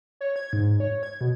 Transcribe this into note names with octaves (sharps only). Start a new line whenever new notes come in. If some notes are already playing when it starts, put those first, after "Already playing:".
C#5
G#6
G#2
C#5
G#6
B2